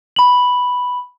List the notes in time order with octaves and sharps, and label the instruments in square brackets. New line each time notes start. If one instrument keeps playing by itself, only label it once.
[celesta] B5 F#7